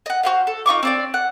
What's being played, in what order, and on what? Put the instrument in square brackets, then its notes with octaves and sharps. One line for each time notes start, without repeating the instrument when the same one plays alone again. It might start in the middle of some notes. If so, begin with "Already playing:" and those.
[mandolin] D#5 F#5
F#4 C5 F5
A4
D#4 F4 C#6 D6
C4 D4 D5
F#5